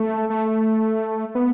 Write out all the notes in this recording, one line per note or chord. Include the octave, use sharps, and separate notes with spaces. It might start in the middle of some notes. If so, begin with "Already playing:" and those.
Already playing: A3
A3
B3